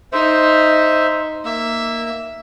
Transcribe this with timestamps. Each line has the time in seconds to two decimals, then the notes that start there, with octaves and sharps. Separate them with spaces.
0.13 D#4 C5 E5
1.45 A#3 E5